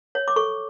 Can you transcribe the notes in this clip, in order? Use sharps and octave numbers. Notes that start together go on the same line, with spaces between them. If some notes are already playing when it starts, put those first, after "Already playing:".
C#5
D6
A4 C#6